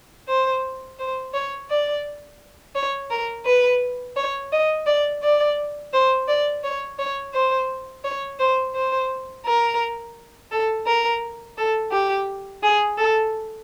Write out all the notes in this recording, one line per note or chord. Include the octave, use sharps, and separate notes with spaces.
C5
C5
C#5
D5
C#5
A#4
B4
C#5
D#5
D5
D5
C5
D5
C#5
C#5
C5
C#5
C5
C5
A#4
A4
A#4
A4
G4
G#4
A4